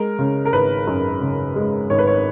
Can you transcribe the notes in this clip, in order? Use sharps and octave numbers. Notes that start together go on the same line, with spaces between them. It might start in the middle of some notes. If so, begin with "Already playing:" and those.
Already playing: G#3 A#4
C#3
A#4
G#1 B4
F#2
C#3
G#3
G#1 C#5
B4
C#5